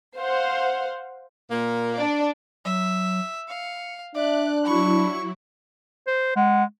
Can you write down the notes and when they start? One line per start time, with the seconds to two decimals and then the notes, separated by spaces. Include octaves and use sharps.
0.18 C5 F5 F#5
1.51 A#2 A#3
1.94 D4 D5
2.65 F#3 E5
3.48 F5 C#7
4.14 D4 D5 E5 F#6
4.65 F#3 E4 B5 C#6
6.07 C5
6.36 G#3 F#5